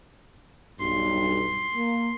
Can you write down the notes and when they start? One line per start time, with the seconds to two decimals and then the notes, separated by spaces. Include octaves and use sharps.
0.80 B1 G2 C6
1.75 A#3